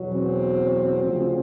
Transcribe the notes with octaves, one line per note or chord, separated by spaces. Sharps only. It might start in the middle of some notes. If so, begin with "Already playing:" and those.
Already playing: E2 B2 F#3
C4
D2 C#3 F3